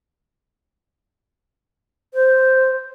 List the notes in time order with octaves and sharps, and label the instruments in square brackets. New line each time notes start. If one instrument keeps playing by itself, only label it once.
[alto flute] C5